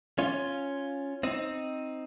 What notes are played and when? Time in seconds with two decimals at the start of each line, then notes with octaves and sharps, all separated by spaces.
0.19 C#4 F4
1.23 C4 D#4